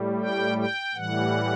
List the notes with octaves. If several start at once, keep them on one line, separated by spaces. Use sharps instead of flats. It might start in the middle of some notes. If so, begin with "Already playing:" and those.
Already playing: A2 G3
G5
G5
A2 E3 G3 F#5